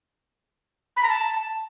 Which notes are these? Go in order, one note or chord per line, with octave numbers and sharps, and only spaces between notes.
B5
A#5
A5